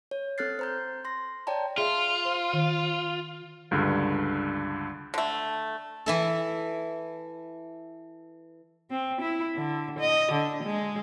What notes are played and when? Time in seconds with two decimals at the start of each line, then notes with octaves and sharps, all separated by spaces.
0.11 C#5
0.38 C4 A4 F6 F#6 A6 C7
0.59 C5 A#5 G6
1.05 C6 A#6
1.47 C#5 D5 G5 A5 A#5
1.78 F4 G#4 E5
2.25 C5
2.53 D#3
3.71 C#2 G2 D3
5.14 D3 A3
6.06 E3 E4 A4
8.90 C4
9.21 E4
9.56 D3
9.99 D#5
10.32 D3
10.63 G#3